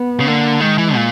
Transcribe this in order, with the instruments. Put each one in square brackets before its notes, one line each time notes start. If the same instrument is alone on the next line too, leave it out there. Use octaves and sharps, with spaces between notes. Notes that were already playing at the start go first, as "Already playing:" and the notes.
Already playing: [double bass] B3
[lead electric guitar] C#3
[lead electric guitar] D3 [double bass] A#3
[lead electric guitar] D#3 [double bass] G#3
[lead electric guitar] E3
A#2